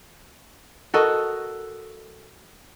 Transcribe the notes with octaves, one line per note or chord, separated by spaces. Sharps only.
F#4 A4 A#4 D#5